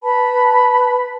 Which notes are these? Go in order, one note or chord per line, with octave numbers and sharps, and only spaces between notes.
B4 A5 B5